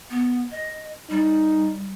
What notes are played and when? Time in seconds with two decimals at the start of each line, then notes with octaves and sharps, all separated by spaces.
0.10 B3
0.51 D#5
1.10 G3 D#4